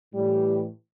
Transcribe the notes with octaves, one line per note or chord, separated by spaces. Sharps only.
A2 E3 G3